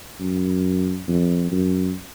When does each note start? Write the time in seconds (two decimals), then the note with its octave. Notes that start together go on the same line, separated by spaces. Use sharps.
0.20 F#2
1.08 F2
1.51 F#2